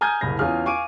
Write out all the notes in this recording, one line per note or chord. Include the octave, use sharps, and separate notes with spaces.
G#5 A#5 D#6 F6 G6 G#6
F#1 C2 B5 A#6
E2 C#4 F4 G#5 D#6 F6
F5 G#5 C#6 D6 D7 D#7